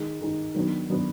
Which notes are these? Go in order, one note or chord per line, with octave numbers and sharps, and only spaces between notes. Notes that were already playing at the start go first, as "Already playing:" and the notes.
Already playing: D#3 G#3 D#4
D#3 G#3 D#4
D#3 F#3 B3 D4
D#3 F#3 B3 D4